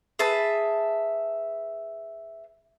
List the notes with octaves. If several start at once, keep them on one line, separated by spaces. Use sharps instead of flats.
G#4 B4 E5 A5